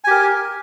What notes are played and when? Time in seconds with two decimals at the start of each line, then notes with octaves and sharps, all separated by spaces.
0.04 G#5
0.07 G4
0.11 A#4